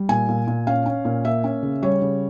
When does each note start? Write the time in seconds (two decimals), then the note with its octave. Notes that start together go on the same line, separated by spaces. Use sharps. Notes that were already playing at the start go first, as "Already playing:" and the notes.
Already playing: G3
0.09 A#2 G#5
0.29 A#2
0.47 A#2
0.67 C#4 F5
0.86 C#4
1.05 A#2
1.24 A#3 E5
1.44 C#4
1.62 C#3
1.82 G3 C#5
2.02 C#3